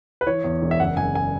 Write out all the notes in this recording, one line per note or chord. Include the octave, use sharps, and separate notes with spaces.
B4
E3 C#5
E2
E1
E5
F#1 F#5
F#1 G#5
G#5